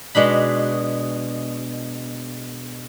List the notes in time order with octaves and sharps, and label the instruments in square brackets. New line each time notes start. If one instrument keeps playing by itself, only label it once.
[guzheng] B2 G#3 D4 B5